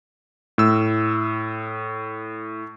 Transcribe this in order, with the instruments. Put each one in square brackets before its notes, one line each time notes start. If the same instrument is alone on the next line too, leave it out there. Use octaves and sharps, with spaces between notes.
[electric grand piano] A2 E6